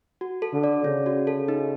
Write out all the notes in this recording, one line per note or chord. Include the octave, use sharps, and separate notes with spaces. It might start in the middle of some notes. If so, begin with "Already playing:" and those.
F#4
A4
D3
D5
C#3 C#4
F#4
A4
D#4